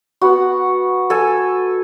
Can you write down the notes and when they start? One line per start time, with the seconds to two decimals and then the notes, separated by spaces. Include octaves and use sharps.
0.21 B3 F#4
1.10 A4 G#5